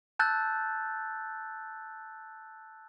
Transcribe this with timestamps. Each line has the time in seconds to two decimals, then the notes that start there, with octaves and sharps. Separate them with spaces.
0.19 A5 E6 F#6 G6 A6